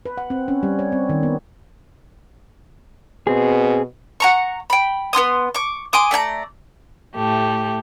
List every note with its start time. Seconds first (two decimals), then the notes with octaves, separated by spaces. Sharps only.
0.06 B4
0.18 F#5
0.30 C4
0.48 C#4
0.63 G3
0.79 C#5
0.92 C4
1.09 D#3
1.23 B3
3.27 B2 C4 G#4
4.20 F#5 A#5 C#6
4.70 G5 B5
5.13 B3 F4 C6 D#6
5.55 C#6 D6
5.93 G#5 C6 D6 D#6
6.11 A3 D5 G#5 A#5
7.16 A2 A3 G4